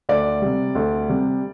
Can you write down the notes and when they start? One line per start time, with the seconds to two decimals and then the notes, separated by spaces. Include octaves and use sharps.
0.09 D2 D5
0.42 C3 G3
0.75 D2
1.09 C3 G3